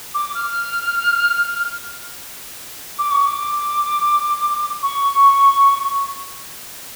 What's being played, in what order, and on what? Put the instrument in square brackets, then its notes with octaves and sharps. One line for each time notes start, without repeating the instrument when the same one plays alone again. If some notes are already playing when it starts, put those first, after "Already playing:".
[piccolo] D6
F6
D6
C#6
D6
C#6